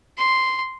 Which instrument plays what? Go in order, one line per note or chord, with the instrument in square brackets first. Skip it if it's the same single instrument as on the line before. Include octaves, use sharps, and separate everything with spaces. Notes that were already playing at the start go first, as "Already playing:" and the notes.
[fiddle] C6